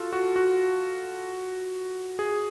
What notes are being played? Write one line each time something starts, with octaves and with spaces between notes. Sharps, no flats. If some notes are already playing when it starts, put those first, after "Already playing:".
Already playing: F4 F#4 A4
F#4
F#4
G#4